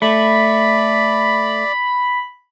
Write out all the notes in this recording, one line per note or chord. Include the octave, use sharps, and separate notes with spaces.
A3 D5 B5